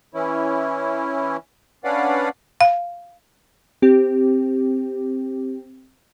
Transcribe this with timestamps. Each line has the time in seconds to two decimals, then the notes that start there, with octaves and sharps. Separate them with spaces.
0.14 E3 C#4 E4
1.84 C#4 D4 B4 D5 F5 F#5
2.61 F5
3.82 C4 G4